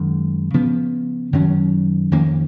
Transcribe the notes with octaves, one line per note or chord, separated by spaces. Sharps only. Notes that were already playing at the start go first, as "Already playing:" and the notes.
Already playing: F#2 D#3 G#3
C#3 F3 B3
F#2 D#3 F#3 C#4
F2 D#3 A#3 C#4